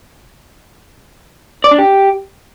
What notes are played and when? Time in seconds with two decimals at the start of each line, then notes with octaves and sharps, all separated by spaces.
1.64 D5
1.71 D4
1.78 G4